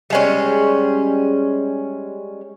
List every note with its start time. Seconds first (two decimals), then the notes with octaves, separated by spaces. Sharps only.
0.10 G3 G#3 C#4